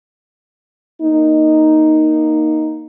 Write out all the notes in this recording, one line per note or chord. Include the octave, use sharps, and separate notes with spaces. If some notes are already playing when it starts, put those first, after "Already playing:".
A#3 D#4